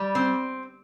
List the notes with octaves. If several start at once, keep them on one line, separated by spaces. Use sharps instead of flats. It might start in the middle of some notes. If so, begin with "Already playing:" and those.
Already playing: G3
C4